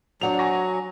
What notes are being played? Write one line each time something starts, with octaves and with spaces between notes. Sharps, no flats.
F#3 D4 C5 F#5 F7
G#5 C#6 A#6